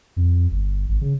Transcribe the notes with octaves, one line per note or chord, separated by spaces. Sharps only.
F2
G1
G#1
C#3